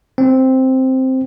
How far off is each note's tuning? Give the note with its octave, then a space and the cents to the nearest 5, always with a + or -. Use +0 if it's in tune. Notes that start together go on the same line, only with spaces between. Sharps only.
C4 +0